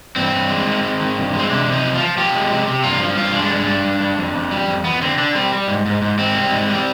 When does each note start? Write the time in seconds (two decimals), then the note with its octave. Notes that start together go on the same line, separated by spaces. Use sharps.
0.16 G2 C4
0.33 G2
0.49 G#3
0.67 D#3
0.83 G#3
1.00 D#3
1.17 G2
1.34 G#3
1.39 C4
1.50 C3 D4
1.68 C3 D#4
1.84 F3
1.95 F4
2.01 F3
2.17 F3 G4
2.35 G#3
2.51 C3
2.67 C3
2.84 G2 F4
3.01 F3
3.17 G2 F4
3.34 G#3 D4
3.51 G2
3.67 G2
3.85 G2
4.01 G2
4.18 F2
4.35 F2
4.51 G3
4.68 F2
4.84 F2 B3
5.02 D3 C4
5.18 D3 D4
5.35 G3 C4
5.52 G3
5.68 G#2
5.86 G#2
6.02 G#2
6.18 G#2 C4
6.35 G3
6.52 G#2
6.69 G3